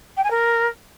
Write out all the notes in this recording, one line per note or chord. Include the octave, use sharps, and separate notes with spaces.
G5
G#5
A#4